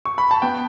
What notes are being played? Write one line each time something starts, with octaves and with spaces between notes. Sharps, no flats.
C#6
B5
A5
B3 G5